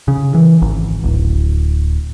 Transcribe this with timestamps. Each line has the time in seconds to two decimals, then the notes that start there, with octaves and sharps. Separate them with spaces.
0.08 C#3
0.35 E3
0.62 G#1
1.04 D1